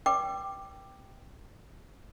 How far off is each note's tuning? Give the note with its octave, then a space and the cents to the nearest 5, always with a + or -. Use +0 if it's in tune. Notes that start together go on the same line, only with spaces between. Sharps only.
B4 -30 G5 +0 D6 +10